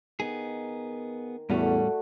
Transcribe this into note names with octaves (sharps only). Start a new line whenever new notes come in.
D#3 B3 G#4
E2 A2 G3 A3 C#4 F#4 D5